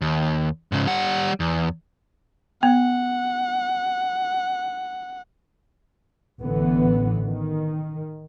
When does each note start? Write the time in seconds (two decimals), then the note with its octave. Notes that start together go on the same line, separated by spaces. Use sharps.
0.01 D#2
0.72 G#2 C#3
0.87 G3 F#5
1.40 E2
2.63 B3 F#5
6.40 A1 D3 E3 B3
7.25 D#3